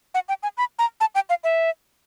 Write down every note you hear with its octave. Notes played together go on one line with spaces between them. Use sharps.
F#5
G5
G#5
B5
A#5
A5
G5
F5
E5